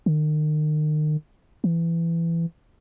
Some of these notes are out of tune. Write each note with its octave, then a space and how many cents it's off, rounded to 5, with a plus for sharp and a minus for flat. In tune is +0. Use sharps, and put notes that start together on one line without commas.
D#3 -35
E3 +20